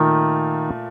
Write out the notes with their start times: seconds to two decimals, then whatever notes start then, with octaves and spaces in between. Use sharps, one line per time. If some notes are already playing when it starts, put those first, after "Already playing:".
Already playing: A#2 D#3 A3